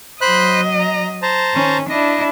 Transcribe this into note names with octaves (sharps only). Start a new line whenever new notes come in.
F#3 C5 D#5 B5 F#6
A#5
C5 A5 A#5
D#3 C#4
D4 E4 D#5